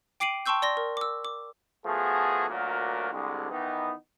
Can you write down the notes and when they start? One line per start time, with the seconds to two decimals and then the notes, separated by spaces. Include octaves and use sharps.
0.20 G5 D6 C7 D7 D#7 F#7
0.46 G5 A5 C6 C#6 E6 G6
0.62 D5 C6 A#6
0.77 A#4
0.97 D6 E6
1.25 D6
1.85 F3 A3 B3 F#4 G#4
2.49 D2 A#2 F#3 A#3 F#4 A#4
3.11 C2 D3 G#3
3.51 D#3 E3 B3 D#4